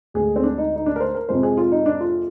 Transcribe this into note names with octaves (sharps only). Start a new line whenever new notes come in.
D2 D3 G#3 G#4
C4
D4
D#4
D#4
D4
A#4
C5
A#4
F2 C3 F3 G#3 C5
G#4
F4
D#4
D4
F4